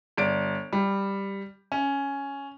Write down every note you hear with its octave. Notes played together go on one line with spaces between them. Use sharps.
G1 D5 D7
G3
C#4